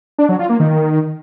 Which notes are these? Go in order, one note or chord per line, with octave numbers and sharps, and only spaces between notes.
D4
F#3
F4
A#3
D#3